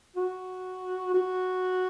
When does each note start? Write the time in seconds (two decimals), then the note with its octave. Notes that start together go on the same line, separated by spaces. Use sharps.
0.16 F#4
1.14 F#4